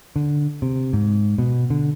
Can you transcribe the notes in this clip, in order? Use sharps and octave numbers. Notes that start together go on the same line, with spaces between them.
D3
C3
G#2
B2
D3